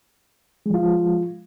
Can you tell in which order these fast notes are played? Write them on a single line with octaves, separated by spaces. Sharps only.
G#3 F3 F4